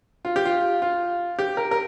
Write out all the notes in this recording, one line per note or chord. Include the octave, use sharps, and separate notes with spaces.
F4
G4
F4
F4
G4
A#4
A#4